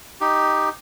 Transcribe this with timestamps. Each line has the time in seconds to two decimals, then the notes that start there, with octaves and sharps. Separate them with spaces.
0.21 D#4 G4